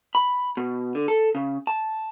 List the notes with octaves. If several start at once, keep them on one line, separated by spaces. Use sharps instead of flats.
B5
B2
D3
A4
C#3
A5